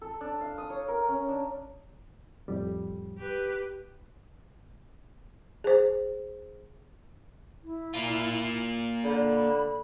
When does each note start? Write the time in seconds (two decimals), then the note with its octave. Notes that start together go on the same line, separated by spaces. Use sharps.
0.02 A4
0.21 D4
0.41 F5
0.58 D#6
0.70 C#5
0.88 A#4
1.08 C#4
1.28 D4
2.48 F2 A2 G3
3.18 G4 B4
5.64 G#4 C5
7.64 E4
7.94 A#3 F4
9.05 D3 B5